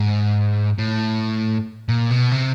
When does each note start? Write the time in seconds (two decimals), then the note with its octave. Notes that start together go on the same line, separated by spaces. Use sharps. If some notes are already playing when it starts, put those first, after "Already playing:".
Already playing: G#2
0.79 A2
1.89 A#2
2.11 B2
2.32 C3